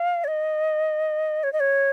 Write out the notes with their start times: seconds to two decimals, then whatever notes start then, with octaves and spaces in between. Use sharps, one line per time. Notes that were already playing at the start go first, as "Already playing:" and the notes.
Already playing: F5
0.24 C#5
0.28 D#5
1.44 C#5
1.53 D#5
1.60 C#5